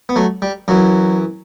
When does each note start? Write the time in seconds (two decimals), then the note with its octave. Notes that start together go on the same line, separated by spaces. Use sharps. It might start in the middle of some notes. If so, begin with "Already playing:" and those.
0.09 B3
0.16 F#3 A3
0.42 G3
0.68 F#2 E3 F#3